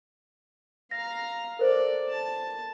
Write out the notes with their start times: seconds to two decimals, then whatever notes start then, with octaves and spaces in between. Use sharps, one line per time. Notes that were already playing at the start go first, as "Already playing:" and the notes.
0.91 F5 A#5 A#6
1.59 A4 A#4 C5 D5
2.09 A5